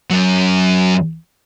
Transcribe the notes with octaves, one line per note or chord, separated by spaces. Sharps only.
F#2 F#3